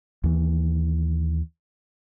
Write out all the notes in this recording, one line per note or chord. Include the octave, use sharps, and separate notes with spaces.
D#2 E3